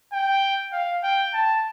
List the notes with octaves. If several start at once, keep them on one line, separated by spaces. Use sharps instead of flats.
G5
F5
G5
A5